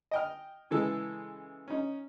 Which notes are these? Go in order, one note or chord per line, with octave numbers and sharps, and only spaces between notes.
D#5 G5 F6
C#3 E3 G#3 A4
C#4 D#4